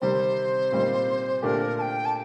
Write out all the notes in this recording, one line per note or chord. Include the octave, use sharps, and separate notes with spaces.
C3 D#3 G3 C4 C5
A#2 G3 C4 D#4
A#2 A3 D4 G4 A#4 C5
A5
G5
A5